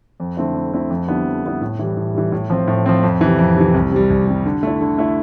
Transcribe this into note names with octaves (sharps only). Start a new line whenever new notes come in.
F2
D3 A3 C4 E4
F2
D3 A3 C4 E4
F2
D3 G3 B3 E4
F2
D3 G3 B3 E4
A2
E3 G3
A2
E3 G3
A2
F3 C4
A2
F3 C4
F2
C3 E3
F2
C3 E3
C2
C3 G3
C2
C3 G3
D3
A3 E4
D3
A3 E4